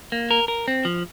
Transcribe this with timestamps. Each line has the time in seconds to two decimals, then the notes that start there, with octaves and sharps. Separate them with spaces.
0.12 A#3
0.31 A#4
0.48 A#4
0.68 C4
0.85 F3